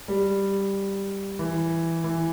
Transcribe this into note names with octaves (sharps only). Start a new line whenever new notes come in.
G3
E3
E3